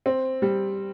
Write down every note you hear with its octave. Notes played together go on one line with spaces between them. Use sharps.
C4
G3